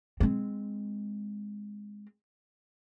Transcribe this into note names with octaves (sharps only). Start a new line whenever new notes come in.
G#3 C4